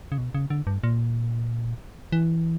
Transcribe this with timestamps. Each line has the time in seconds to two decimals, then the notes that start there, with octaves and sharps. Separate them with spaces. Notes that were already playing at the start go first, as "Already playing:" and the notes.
0.12 C#3
0.18 B2
0.35 C#3
0.50 D3
0.67 G2
0.84 A#2
2.12 E3